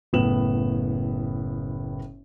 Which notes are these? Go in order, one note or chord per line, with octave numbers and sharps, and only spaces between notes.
F#1 A2 B3 E7 F#7